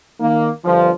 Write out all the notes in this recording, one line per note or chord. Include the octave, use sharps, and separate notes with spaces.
D#3 A#3
G1 F3